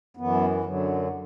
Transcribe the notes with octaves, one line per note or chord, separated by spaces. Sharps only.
F#2 E3 B3
F#2 D3 F#3